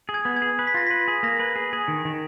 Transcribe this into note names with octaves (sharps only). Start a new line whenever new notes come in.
G#4
G#6
B3
G#6
G#4
B4
B6
F4 A#6
B4 B6
G#4
A#3 A#6
B4
G#4
G#4
D#3
D#3